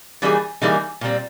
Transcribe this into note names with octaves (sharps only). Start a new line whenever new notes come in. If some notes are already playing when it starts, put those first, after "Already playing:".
E3 G3 A#3 D#4 G#4
E3 G3 A#3 D#4 G#4
A#2 G3 C4